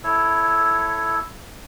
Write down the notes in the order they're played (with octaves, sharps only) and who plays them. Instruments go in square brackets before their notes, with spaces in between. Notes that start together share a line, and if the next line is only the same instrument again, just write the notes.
[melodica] E4 A4 C#5